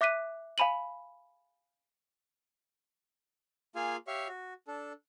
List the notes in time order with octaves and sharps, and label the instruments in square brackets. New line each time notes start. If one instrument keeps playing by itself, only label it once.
[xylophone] E5 D6 F#6 B6 D#7
F5 G#5 B5 D#7 F#7
[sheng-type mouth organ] A#3 F4 G#4 F5 G#5
G4 C#5 E5 F5 C#6
F#4
D4 A4